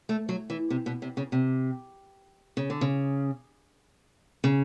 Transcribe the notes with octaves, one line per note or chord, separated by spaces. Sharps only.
A3
F#3
E3
C3
B2
C3
C#3
C3
C#3
D3
C#3
C#3